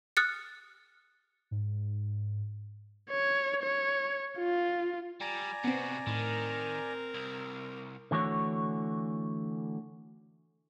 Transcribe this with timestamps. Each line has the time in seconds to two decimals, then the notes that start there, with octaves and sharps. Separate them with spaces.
0.17 D#6 F6 F#6 A6 C#7
1.51 G#2
3.10 C#5
3.63 C#5
4.39 F4
5.21 G3 D5 G#5 A#5
5.64 C3 B3 C4 F#4
6.07 A2 D#3 C4 A#4
7.15 C2
8.11 D3 E3 A3 F#4 C#5